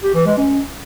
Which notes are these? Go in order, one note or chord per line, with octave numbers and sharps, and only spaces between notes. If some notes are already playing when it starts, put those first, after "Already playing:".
G4
E3
G#3
C#4